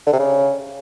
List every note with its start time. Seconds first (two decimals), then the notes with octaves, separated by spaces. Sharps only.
0.07 D3
0.13 C3
0.19 C#3